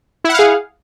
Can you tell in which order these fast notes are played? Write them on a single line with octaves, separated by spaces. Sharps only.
E4 F#5 F5 G#4